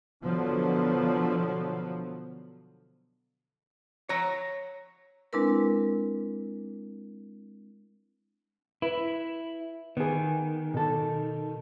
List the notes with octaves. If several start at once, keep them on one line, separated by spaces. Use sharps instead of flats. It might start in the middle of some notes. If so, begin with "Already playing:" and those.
B2 D3 F3 F#3 B3
C#5 A#5
G#3 C4 D4 E4 A#4 B4
E4 B4
D#3 B3 G#4
B2 A4